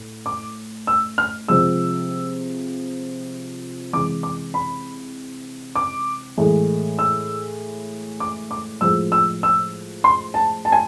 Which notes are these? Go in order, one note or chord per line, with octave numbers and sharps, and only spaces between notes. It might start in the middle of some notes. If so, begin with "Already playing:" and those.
Already playing: A2
D6
E6
F6
C3 F3 G#3 E6
C3 E3 G#3 D6
D6
B5
D6
A2 E3 G#3
E6
D6
D6
A2 F3 G#3 E6
E6
E6
C6
A5
A5
G#5